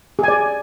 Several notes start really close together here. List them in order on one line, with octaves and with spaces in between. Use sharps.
G#4 G#5 D5